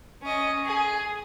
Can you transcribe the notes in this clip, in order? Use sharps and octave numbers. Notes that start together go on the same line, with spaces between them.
C#4 D#5
G#4